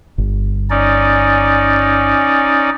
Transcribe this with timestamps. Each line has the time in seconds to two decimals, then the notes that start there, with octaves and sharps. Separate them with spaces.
0.18 G1
0.70 C#4 D#4 D5